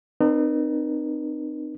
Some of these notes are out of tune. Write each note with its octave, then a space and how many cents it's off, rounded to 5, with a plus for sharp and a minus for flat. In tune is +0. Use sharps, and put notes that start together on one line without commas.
C4 -15 D#4 -40 A#4 +40